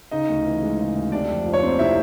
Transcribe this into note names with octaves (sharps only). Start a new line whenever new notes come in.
C#3 D#4 D#5
D2
E3
G#3
C#3
D2
C3 D4 D5
F2
F3
C#5
A#3 C4 C5
C3 E4 E5